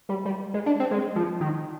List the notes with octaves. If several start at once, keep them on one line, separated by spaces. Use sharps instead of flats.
G3
G3
G#3
D4
C4
G#3
F3
D#3